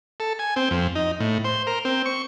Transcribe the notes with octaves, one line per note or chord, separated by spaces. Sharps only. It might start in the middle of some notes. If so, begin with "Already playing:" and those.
A4
G#5
C4
F2
D#4
A2
C5
A#4
C4
C#6